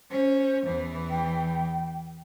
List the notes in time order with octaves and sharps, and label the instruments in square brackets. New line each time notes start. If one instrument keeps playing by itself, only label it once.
[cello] C#4 [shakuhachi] C5
[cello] E2 E3
[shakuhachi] G5